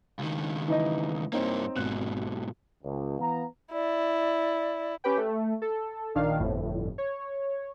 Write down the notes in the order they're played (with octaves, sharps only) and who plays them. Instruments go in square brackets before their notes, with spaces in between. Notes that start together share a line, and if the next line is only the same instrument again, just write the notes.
[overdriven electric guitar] C#2 D#3
[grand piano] E3 D#4 D#5
[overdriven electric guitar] G2 A#3 [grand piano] C4 D#4 C#5
[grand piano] G#1 F#6 [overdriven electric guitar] G#2 B2
[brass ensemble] C#2
E3 B3 F5 A#5
[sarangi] E4 [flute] D5
[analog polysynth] C#4 G4 B4 G5
A3
A4
A#1 D#3 D4 F5
G1 F2 A2
C#5